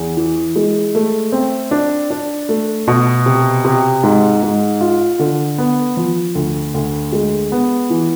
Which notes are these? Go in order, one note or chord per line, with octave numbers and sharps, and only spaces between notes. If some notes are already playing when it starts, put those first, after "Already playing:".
Already playing: E2
E3
G#3
A3
C4
D4
D4
A3
B2
C3
C3
G#2
G#2
F4
D3
B3
F3
D2
D2
G#3
B3
E3